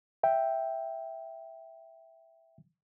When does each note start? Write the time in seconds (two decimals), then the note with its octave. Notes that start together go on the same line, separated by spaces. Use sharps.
0.23 E5 G5